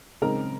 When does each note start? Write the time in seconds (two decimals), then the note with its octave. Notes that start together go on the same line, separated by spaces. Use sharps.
0.22 C#3 G#3 C4 D#4 A#4 A#5